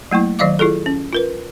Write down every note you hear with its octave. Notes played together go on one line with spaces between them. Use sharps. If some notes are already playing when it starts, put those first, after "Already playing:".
F#3 A3 A#3 E4
D#3 F#3 D5 D#5 F5 D6
E4 F4 G#4 A4
C#4
F4 A#4 B4